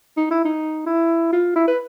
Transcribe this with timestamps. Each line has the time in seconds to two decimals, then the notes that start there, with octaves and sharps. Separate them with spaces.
0.17 D#4
0.30 E4
0.44 D#4
0.86 E4
1.32 F4
1.56 E4
1.67 B4